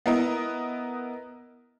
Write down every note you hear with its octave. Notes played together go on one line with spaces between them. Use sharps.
B3 E4 A#4 D#5